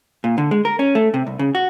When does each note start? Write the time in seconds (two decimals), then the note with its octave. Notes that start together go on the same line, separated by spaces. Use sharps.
0.24 A#2
0.38 D3
0.51 G#3
0.65 A#4
0.79 C#4
0.95 A3
1.14 C3
1.27 C2
1.39 C#3
1.55 F#4